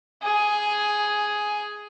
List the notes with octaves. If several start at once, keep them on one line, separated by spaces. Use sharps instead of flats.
G#4